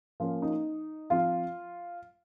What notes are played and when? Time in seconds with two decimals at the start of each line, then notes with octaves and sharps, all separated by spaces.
0.20 F3 A#3 C#4 F4
0.42 D#4
1.10 F3 C4 F4